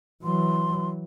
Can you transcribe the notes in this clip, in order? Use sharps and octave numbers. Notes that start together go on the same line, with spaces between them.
E3 F#3 C6